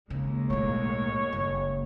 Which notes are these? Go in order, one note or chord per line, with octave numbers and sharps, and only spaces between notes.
D#2 C#3 G#3
B1 A2 C#5
F#1